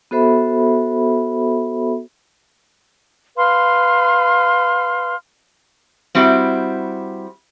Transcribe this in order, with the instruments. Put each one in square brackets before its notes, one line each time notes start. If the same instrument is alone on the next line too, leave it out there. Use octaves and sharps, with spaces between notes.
[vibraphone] B3 F#4 A4 C5 E5 B5
[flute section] B4 F5 C6 F6
[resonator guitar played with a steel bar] G3 C4 E4 F#4 G4